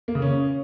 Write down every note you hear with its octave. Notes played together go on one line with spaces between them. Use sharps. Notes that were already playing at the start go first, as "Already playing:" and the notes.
A#3
C#3
C#4